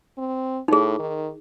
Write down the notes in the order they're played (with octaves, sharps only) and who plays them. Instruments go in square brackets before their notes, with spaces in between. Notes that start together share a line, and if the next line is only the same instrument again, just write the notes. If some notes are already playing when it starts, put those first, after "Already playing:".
[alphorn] C4
[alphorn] A2 [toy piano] D#4 G#4
[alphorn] D#3